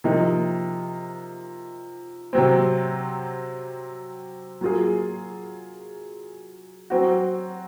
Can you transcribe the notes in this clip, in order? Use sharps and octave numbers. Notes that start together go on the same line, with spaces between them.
C3 F3 A#3 D#4
C3 F#3 C4
F#3 A#3 F4 G#4
F#3 C4 F#4